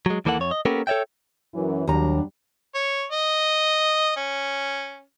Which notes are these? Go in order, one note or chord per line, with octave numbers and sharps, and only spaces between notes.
F#3 G#3
D#2 E3 A#3 A4 D#5 F#5
F2 C#5
D#5
A#3 B3 C#4 G4 A4 A#4
A4 C#5 D5 E5 G5
F#2 E3
D#2 F#3 G3 D4 A#5
C#5
D#5
C#4